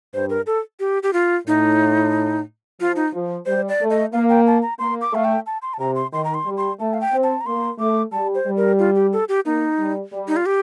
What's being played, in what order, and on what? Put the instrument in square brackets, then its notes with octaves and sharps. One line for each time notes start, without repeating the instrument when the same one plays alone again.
[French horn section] G2 [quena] C5
[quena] A#4
A4
G4
G4
F4
[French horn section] A2 [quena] D#4
[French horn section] F3 [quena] F4
[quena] D#4
[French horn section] F3
[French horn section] G3 [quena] C5
[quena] D5
[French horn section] A3
[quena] D#5
[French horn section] A#3 [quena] F5
[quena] G5
A5
A#5
[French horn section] A#3 [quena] C6
[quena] D6
[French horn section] A3 [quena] F5
[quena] G5
A5
C6
A5
[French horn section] C3 [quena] A#5
[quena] C6
[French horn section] D#3 [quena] C6
[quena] A#5
C6
[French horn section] G3
[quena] C6
[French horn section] A3 [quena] A5
[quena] F5
G5
[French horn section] C4
[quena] A5
A#5
[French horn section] A#3 [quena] C6
[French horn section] A3 [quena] D6
[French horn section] G3 [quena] A5
[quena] C5
[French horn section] G3
[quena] A#4
F4
G4
A4
G4
[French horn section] A#3 [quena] D#4
[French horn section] G3
G3
[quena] D#4
F4
G4